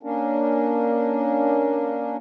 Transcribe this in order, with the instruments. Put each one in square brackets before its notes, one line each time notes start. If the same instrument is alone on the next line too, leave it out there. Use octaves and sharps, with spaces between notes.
[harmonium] A#3 C#4 D4